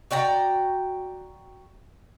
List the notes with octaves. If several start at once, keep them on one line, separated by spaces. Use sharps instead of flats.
F#4 D5 G5 A#5